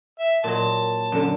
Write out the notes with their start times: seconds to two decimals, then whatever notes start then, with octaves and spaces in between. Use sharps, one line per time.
0.19 E5
0.44 A#2 F#3 D#5 A5
1.12 F#2 D3